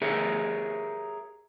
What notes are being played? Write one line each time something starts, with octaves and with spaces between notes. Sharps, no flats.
G4 G#4 A#4 C#5 E5